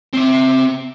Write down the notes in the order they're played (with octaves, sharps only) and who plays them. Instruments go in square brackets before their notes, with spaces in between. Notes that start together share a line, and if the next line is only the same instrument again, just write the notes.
[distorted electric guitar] C4 E5